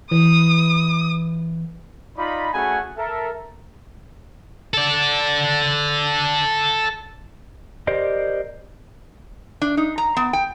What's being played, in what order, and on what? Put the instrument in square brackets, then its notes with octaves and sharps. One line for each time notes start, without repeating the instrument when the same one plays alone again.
[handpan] E3 [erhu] D#6
[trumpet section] D#4 F4 D5 B5
A3 C#4 F#4 G#4 F#5 G#5
A4 A#4 E5
[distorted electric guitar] A4 D5
[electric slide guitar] G4 A#4 C5 D5 D#5
[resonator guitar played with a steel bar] D4
D#4
A#5
B3
G5